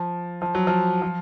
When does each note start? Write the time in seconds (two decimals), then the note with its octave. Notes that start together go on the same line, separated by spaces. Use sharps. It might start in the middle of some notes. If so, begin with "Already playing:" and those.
Already playing: F3
0.42 F3
0.55 F#3
0.67 F3
1.02 F3